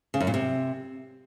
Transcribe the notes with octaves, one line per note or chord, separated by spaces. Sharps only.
C#3
F#2
A#2
C3